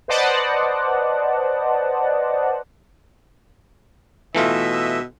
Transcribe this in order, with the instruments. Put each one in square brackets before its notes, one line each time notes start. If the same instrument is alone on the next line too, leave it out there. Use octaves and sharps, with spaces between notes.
[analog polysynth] B4 C5 D5 D#5 F#5 A5
[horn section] B2 D#5 E5 [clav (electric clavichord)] E3 A3 F4